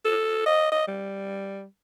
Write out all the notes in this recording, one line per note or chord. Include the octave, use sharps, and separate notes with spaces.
A4
D#5
D#5
G3